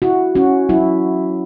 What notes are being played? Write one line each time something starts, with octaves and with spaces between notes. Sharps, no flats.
E4 F#4
C#4 F#4
F#3 E4